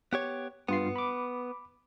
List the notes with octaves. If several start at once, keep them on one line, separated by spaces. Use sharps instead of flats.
B3 G4 C#5
G2 B3 F4 C7
B5 D6